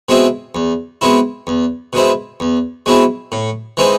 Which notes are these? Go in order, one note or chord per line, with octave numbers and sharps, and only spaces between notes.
B2 G#3 C4 E4
E2
B2 G#3 C4 E4
E2
B2 G#3 C4 E4
E2
B2 G#3 C4 E4
A2
E3 G#3 C4 D#4